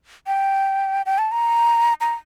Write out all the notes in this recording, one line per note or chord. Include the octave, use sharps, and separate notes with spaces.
G5
G5
A5
A#5
A#5